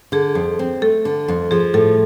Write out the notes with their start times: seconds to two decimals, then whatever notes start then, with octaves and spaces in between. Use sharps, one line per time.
0.12 D3 G#4
0.35 F2
0.59 C4
0.82 A3 A4
1.05 D3
1.28 F2
1.51 F3 G#4
1.74 A2 A4